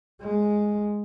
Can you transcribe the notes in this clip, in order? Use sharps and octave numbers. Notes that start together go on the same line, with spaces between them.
G#3